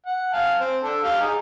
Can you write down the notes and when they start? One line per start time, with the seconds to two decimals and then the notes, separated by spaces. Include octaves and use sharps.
0.06 F#5
0.33 F5 G#5 A5
0.61 C4
0.84 D4 A4
1.04 G4 F5
1.20 D#4 G#4